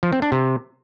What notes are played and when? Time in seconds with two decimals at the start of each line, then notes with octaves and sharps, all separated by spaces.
0.03 F3
0.12 C4
0.22 D4
0.32 C3